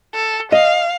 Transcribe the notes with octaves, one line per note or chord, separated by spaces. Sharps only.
A4
D#5 F5